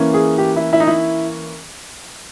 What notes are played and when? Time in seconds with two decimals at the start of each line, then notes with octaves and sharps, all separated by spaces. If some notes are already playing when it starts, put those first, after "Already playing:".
Already playing: E3 A#3 C#4
0.14 G#4
0.38 G4
0.56 E4
0.73 E4
0.80 D#4
0.87 E4